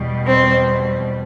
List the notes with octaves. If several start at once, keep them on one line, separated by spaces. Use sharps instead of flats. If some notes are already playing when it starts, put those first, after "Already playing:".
Already playing: E2 B2 G3
C4